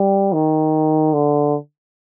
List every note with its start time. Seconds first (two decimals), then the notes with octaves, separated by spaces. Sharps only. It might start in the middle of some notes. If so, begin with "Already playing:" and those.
Already playing: G3
0.33 D#3
1.13 D3